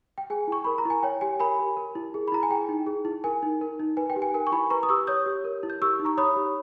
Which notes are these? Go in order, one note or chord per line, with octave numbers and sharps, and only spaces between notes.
G5
G#4 G#5
E4 C#6
A#4 B5
A#5
E4 G#5
C#5 G5
G4 G#5
A#4 G#5 B5
G4
A#4
E4
G#4
B5
E4 A#5
G#5
G#4 G5
D#4
G#4
E4
A#4 G#5
D#4
A#4
D#4
B4 G#5
G5
G4
G#5
A#4 G#5
C#6
E4 G#5 B5
B4 A#5 C#6
D#6
G4 C#6 E6
C#5 D#6 G6
G4
A#4
E4
G6
G4 C#6 E6
D#4
A#5 C#6
C#5 B5 D#6
G4